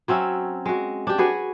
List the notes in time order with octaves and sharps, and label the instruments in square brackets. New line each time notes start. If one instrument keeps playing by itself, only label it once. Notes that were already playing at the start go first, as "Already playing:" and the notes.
[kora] F#3 C4 C#4 E5
G#3 F#4
D4 G4
F#4 G#4 B4 C#5